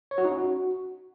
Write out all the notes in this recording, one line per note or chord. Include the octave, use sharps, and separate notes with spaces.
C#5
F#4
D#4
C#4
F#4